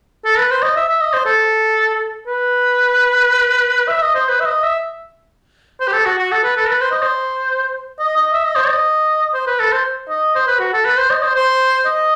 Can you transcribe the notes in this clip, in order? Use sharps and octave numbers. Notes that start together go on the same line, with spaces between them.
A4
B4
C5
D#5
E5
E5
D#5
C5
A4
B4
E5
D#5
C5
B4
E5
D#5
E5
C5
G4
A4
F#4
F#4
A4
B4
A4
B4
C5
D#5
C5
D#5
D#5
E5
D#5
C5
D#5
C5
B4
A4
C5
D#5
C5
B4
F#4
A4
B4
C5
D#5
C5
C5
D#5